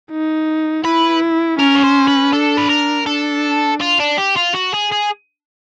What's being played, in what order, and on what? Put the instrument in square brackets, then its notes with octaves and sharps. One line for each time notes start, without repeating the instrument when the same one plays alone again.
[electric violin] D#4
[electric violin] E4 [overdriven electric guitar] B4
[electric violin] C#4 [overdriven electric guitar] A#4
[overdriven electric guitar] C#5
C5
B4
[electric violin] D4 [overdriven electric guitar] A4
[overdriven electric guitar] B4
A#4
[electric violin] D4 [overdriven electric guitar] A4
[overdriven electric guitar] F4
D4
G4
F4
F#4
G#4
G#4